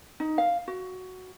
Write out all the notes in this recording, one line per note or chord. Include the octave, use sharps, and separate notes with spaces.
D#4
F5
F#4